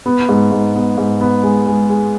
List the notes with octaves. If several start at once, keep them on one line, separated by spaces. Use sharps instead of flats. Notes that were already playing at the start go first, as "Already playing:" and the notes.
B3
G#2
G#2
B3
G#2
B3
G#3
G#3
G#3